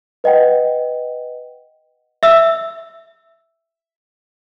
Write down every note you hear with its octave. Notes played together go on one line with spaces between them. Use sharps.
B4 D#5 F#5 G5
E5 E6